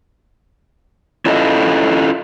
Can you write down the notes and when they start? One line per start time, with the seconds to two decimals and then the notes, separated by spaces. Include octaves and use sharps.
1.26 C#4 E4 F4 A4 D#5 E5